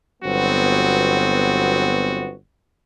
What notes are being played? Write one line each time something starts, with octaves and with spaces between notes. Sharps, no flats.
G1 F#3 B3 C4 F#4